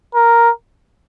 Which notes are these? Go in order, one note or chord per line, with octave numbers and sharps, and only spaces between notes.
A#4